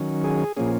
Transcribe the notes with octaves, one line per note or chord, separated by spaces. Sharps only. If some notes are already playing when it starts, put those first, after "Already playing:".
Already playing: D#3 F#3 C#4
G#4
A#2 F3 A#3 C#4 G#4